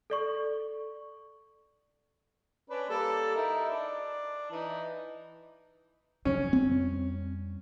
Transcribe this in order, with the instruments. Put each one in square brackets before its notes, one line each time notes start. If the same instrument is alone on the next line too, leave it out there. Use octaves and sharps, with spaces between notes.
[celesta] A4 D5 C#6
[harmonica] C#4 D4 B4
G3 A#3 A4
D#4 E4 A#4
D4
E3 D#4
[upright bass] F2 G3 [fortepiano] C#4
[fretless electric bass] C4